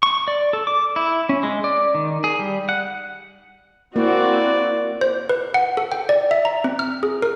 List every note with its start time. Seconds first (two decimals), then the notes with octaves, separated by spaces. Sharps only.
0.03 C#6
0.28 D5
0.53 A4
0.67 D6
0.96 E4
1.29 C#4
1.43 G#3
1.64 D5
1.95 D#3
2.24 G#4
2.39 G3
2.69 F#5
3.96 A#3 C4 E4 F#4 D5
5.01 C5
5.29 B4
5.54 F#5
5.77 A4
5.92 G5
6.09 D5
6.31 E5
6.45 A#5
6.64 C4
6.79 F6
7.03 G#4
7.22 A#4